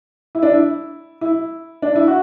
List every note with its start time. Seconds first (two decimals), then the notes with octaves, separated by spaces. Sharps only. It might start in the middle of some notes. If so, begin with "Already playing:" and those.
0.35 E4
0.43 D4
0.50 E4
1.21 E4
1.82 D4
1.96 E4
2.08 F#4